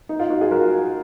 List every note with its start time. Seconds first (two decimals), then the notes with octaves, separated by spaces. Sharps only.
0.09 D#4
0.19 F4
0.30 D#4 F#4
0.41 F4 G#4
0.51 F#4 A#4